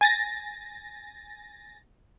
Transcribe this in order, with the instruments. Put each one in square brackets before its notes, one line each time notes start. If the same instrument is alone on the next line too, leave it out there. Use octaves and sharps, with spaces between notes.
[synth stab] G#5 A6 A#6